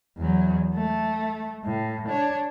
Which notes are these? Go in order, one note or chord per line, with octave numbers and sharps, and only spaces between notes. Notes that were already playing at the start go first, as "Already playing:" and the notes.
E2 F#3
A3
A2
D4 C#5